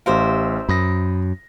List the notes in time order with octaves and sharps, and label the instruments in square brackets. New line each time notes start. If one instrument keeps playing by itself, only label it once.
[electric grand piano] A1 G4 F5 [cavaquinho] A#4 C5 E5
[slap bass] F#2 [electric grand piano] B5 D#6 A#6